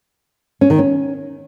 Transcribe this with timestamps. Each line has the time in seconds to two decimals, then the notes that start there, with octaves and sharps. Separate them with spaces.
0.61 C#4
0.70 D#3
0.79 C#4